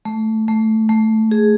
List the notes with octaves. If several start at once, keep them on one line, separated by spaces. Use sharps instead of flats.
A3
A3
A3
G#4